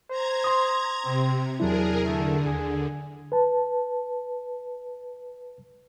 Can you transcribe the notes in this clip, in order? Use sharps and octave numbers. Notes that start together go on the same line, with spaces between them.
C5 A#5 G#6
C6 D#6
C3 C4
E2 F#3 D4 E4 G#4 A#4
D3 A3
D#2 G#4
B4 A5